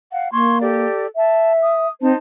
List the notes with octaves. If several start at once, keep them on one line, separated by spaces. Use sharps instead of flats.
F5 F#5
A#3 C6 C#6 G#6
G4 A4 D5
E5 A5
D#6
C4 D#4 C5 A5